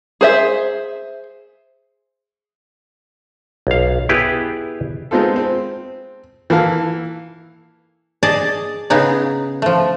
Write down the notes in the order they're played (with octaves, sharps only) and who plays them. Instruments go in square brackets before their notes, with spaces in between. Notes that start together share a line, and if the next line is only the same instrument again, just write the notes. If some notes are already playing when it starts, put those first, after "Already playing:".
[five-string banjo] G#4 C5 E5
[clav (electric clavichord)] B1 F5
B3 E4 G4 G#4 B4
[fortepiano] G#3 B3 C4 D#4 F4 A4
C4
E3 A#3 A4 F5
[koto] G#4 D5 D#5 A5
C#3 B3 D#4 G#4
F3 A3